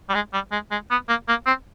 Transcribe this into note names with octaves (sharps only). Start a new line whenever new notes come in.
G3
G#3
G3
G#3
G#3
B3
A#3
A#3
C4